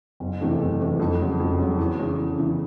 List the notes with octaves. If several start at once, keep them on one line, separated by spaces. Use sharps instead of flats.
F#1
E2 C3 E3 A3
F#1
E2 C3 E3 A3
F2
C#3 F#3
F2
C#3 F#3
E2
C#3 E3
E2
C#3 E3